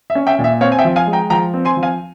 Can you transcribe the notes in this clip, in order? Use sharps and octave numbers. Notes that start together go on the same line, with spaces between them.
E5
C#4
E5 G5
A#2
E5
C4 C#5 F5
G#5
E5 G5
F3
F5 G#5
G#3
G5 A#5
F3 G5 A#5
C4
G#5 C6
F3
F5 G#5